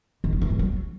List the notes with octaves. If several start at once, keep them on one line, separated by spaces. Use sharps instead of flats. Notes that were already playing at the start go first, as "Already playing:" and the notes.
D#3
G3
E3
G#2
F#3